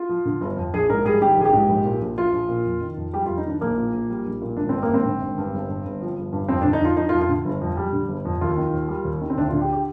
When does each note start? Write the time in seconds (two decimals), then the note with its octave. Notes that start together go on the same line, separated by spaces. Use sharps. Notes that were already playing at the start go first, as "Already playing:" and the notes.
Already playing: F4
0.09 F3
0.25 D3
0.41 G1
0.57 F2
0.74 A#1 G#4
0.89 G#2 A#4
1.05 G3 G#4
1.21 D#3 G4
1.37 A#1 G#4
1.45 G4
1.53 G#2
1.69 A#1
1.85 A#2
2.01 A#1
2.17 F3 F4
2.33 A#1
2.49 A#2
2.65 F2
2.81 D#3
2.97 F2
3.13 G3 G4
3.26 F4
3.29 F2
3.38 D#4
3.45 D#3 D4
3.61 A#1 A#3
3.77 A#2
3.93 A#1
4.10 G3
4.25 A#1
4.42 A#2
4.57 G#1 D4
4.69 G2 C4
4.82 A#3
4.89 G#1
4.94 C4
5.05 D3
5.22 G#1
5.38 G2
5.54 G1
5.69 G2
5.85 G1
6.01 F3
6.18 G1
6.33 G2
6.49 F2 C4
6.62 D3 D4
6.73 D#4
6.81 F2 F4
6.97 F3 D#4
7.09 F4
7.13 F2
7.21 F4
7.29 D3
7.45 G1
7.61 F2
7.77 G3
7.92 D3
8.09 G1
8.25 F2
8.41 D#2 F4
8.57 D#3
8.74 D#2
8.88 G3
9.05 D#2
9.21 D#3
9.30 C4
9.37 D2 D4
9.48 F4
9.53 D3
9.61 G4
9.73 G4